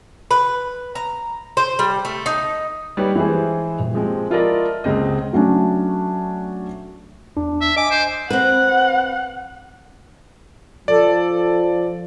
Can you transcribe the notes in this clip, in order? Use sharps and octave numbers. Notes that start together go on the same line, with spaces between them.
B4
A#5
C5
G3
A3
D#4
G3 D#4 G4 B4 C#5 G5
E3 G#3 E4 G#4 C5
D#1
F3 G#3 C4 G4
E4 F4 A4 A#4 D5 D#5
C#2 C#3 C4 D#5
F#3 A3 C#4 D4
E2 D4
E5
D#5 G#5 D6
C5
C4 B4 F#5
F3 A4 D5